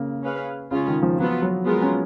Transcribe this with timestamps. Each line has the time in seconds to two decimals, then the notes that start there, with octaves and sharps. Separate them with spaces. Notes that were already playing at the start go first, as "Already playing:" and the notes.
Already playing: C#3 A#3
0.23 C#4 G#4 B4 F5
0.71 C#3 G#3 C#4 F4
0.88 D#3
1.02 F3
1.19 F3 F#3 B3 F4
1.42 F#3
1.66 G#3 B3 F4 A#4
1.82 C#4